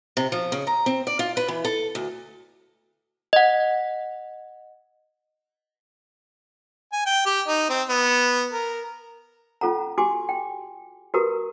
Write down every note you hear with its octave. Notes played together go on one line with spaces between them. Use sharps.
C3
F3
C#3
A#5
C4
D5
F4
B4
E3
A4
D2
D#5 F#5
G#5
G5
G4
D#4
C4
B3
A#4
C#4 F4 A4 F#5 A#5
F#4 G4 G#5 C6 D6
G5
F#4 G4 A#4 B4 A#5 D#6